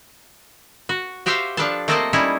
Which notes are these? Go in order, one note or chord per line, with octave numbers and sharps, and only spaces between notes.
F#4
F#4 G4 C5 E5 F5 G5
F3 D4 A4 B4 F5 A5
A3 A#3 C4 A4 D5 D#5
G3 C#4 D#4 E4